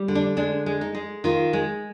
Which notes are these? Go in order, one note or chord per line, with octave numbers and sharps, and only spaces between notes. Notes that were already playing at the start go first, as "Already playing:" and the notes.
Already playing: G3
D3
D4
G#3 D4
G#3
D#4
G#3
D#3 F4
G#3